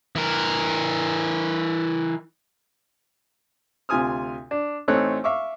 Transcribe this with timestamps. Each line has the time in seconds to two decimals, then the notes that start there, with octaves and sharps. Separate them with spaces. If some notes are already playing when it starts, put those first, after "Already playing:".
0.16 E3 A#4
3.89 D2 C3 F4 G#5 D#6 F6
4.51 D4
4.88 A1 A3 C4 D#4 C#5 F#6
5.24 E5 F5 C#6 D6